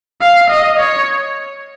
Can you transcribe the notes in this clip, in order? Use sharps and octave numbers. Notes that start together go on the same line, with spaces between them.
F5
D#5
C#5